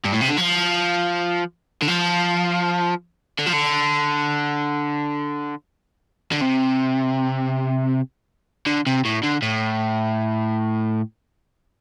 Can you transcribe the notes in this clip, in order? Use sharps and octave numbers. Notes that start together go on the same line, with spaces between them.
G2
A2
C3
D3
F3
D3
F3
D3
F3
D3
D3
C3
D3
C3
A2
D3
A2